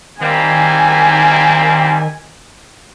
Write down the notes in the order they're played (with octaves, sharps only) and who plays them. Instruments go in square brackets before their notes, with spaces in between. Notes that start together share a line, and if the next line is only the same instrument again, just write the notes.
[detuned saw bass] D#3 [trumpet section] G3 A#3 C4 [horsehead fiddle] G#5